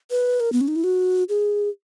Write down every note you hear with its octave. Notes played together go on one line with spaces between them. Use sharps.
B4
A#4
B3
C#4
D#4
E4
F#4
G#4